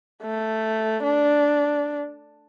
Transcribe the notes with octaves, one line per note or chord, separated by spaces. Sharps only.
A3
D4